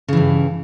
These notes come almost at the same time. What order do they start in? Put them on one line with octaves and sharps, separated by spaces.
C#3 E3 G2